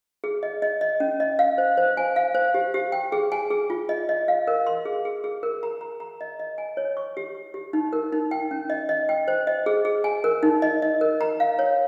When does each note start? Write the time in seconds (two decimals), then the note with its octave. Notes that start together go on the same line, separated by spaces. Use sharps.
0.24 G#4
0.43 D#5
0.62 D#5
0.81 D#5
1.00 C#4
1.20 D#5
1.39 F5
1.58 C5
1.77 C5
1.97 G#5
2.16 F5
2.35 C5
2.54 G4
2.74 G4
2.92 G5
3.12 G#4
3.32 G#5
3.50 G#4
3.70 F4
3.89 D#5
4.09 D#5
4.28 F5
4.47 A#4
4.67 C6
4.85 G#4
5.05 G#4
5.24 G#4
5.43 A#4
5.63 A#5
5.81 A#5
6.00 A#5
6.21 D#5
6.40 D#5
6.58 G#5
6.77 C#5
6.97 C#6
7.17 G4
7.35 G4
7.54 G4
7.73 D#4
7.93 A#4
8.13 D#4
8.31 G5
8.51 C#4
8.70 D#5
8.89 D#5
9.09 G5
9.28 C5
9.47 D#5
9.66 G#4
9.85 G#4
10.04 G#5
10.24 A#4
10.43 D#4
10.62 D#5
10.82 D#5
11.01 A#4
11.21 A#5
11.40 F5
11.59 C#5